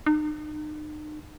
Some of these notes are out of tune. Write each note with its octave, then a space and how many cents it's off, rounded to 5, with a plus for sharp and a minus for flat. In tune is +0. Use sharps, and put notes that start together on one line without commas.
D#4 -40